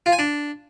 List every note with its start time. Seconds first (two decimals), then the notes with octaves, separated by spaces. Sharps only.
0.06 F4
0.12 G#5
0.19 D4